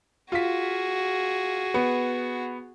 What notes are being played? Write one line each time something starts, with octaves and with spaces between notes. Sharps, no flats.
F4 F#4 G#4 B6
B3